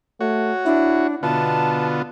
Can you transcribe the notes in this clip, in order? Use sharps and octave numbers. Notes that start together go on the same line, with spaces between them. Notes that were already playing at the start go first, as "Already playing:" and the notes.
A3 F#4 C#5
D4 E4
B2 D3 B3 F4 A5